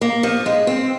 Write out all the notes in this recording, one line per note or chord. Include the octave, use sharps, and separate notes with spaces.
A#3
F3
G#3
C4